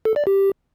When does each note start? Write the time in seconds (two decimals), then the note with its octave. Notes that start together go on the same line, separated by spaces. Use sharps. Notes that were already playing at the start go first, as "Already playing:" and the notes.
0.05 A4
0.16 D5
0.27 G4